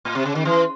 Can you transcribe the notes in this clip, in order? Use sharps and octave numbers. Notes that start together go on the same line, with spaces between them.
A2
C3
C#3
D#3
E3